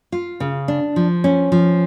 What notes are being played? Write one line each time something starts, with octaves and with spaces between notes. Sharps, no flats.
F4
C#3
D4
F3
C#4
F3